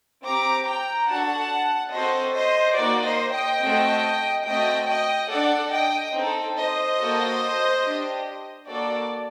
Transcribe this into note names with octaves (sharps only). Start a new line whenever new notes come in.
C4 G4 A#5 D6
G5 A#5
D4 F#4 A4 F#5 A5
C4 F#4 A4 C5 D#5
C5 D#5
A#3 D#4 F#4 D5
C5 D#5
D#5 G5
A3 C4 F#4 A4
A3 C4 F#4 D#5 G5
D#5 G5
D4 A4 D5 F#5
D#5 G5
C4 D#4 A4
C5 D#5
A#3 F#4 A4
D4 G4
A#3 F#4 A4 D5